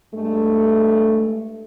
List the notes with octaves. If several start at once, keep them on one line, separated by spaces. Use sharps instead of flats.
G2 G#3 A3